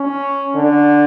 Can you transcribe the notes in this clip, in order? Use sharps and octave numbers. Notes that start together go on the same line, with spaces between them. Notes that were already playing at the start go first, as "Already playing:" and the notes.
Already playing: C#4
D3